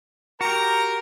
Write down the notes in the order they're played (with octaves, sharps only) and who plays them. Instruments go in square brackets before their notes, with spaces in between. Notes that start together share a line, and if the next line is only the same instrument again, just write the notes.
[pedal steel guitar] F#4 G4 [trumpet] A#4 [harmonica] A#5